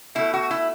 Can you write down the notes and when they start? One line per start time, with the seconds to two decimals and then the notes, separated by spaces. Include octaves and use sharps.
0.15 B2 A3 E4
0.33 F#4
0.51 E4